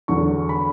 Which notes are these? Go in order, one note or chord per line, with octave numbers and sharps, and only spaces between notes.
E2 D3 F#3 C#6
B5